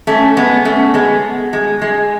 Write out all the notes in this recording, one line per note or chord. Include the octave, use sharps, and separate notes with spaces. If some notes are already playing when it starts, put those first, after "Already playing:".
A3 C#4
G#3 B3
A3 C#4
G#3 B3
G#3
G#3